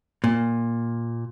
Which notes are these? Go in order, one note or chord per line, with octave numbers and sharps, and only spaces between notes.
A#2